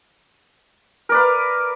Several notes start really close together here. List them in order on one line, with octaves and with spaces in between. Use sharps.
A#4 D5 B4 F5